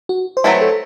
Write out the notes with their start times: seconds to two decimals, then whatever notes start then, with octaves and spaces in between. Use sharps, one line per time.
0.09 F#4
0.37 C5
0.44 F#3 A3 C4 E4 B4
0.61 A4